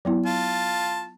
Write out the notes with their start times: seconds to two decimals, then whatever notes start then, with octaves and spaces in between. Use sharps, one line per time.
0.05 F#3 B3 E4
0.26 F4 A5